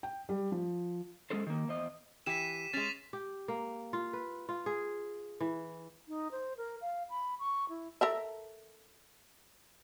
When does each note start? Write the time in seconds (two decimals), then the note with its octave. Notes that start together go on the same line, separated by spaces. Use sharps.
0.03 G5
0.29 G3
0.52 F3
1.30 G#3 C#4 G#4 A4 C5
1.47 D#3 A#3
1.68 E2 C5 D#5
2.26 E3 G4 B6 D#7 E7
2.73 G#3 C#4 A6 B6 F7
3.13 G4
3.48 A#3
3.93 F4
4.13 B4
4.49 F4
4.66 G#4
5.40 E3
6.08 D#4
6.31 C5
6.57 A#4
6.81 F5
7.10 B5
7.39 C#6
7.69 E4
8.01 A4 A#4 E5